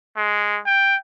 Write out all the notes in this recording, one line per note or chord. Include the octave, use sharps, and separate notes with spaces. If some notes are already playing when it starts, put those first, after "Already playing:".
G#3
G5